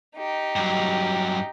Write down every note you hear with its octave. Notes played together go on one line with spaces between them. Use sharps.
D#4 G4
G2 F#3